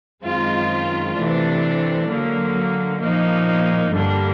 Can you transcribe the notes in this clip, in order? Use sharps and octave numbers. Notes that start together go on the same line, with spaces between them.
F#2 D#3 G#3 C4 F4
C3 E3 A3 D4
D3 F#3 A#3
A#2 F3 A#3 D#4
G2 D3 G3 A#3 D4